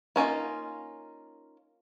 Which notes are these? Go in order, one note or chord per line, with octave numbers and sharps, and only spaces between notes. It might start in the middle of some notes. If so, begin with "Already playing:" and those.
A#3 C#4 D#4 F4